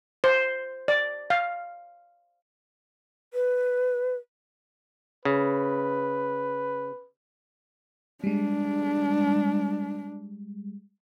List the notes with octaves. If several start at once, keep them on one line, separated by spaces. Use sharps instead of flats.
C5
D5
F5
B4
C#3 B4
G3 G#3 D4